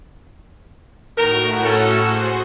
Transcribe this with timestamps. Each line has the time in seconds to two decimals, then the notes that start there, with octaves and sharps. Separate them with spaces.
1.17 A2 D#3 F#4 A#4
1.64 C#4 A4
2.03 F#4 G#4 C5